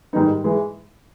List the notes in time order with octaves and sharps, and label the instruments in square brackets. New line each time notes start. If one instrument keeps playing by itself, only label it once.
[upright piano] G#2 D#3 G3 B3 D#4
E3 G#3